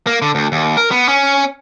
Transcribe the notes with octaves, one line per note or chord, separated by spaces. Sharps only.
A#3
D3
D2
D#2
A#4
B3
C#4